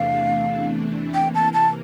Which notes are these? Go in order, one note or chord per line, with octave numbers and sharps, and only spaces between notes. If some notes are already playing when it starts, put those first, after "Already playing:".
Already playing: E2 C3 E3 A3 D4 F5
C3 E3 A#3 G5
A5
A5